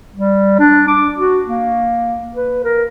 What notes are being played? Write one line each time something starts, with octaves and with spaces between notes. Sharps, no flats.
G3
D4
D6
F#4
A#3
B4
A#4